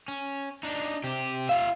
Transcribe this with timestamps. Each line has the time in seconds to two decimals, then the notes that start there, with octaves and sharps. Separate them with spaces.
0.08 C#4
0.63 D4 D#4
1.04 C3 G4
1.49 F4 E5 F5